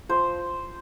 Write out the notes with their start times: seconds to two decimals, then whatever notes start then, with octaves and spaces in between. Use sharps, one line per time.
0.09 F3 C5